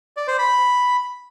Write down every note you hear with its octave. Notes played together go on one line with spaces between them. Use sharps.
D5
C5
B5